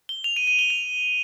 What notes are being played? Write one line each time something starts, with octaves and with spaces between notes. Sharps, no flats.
G7
F7
D#7
D#7
G7
F7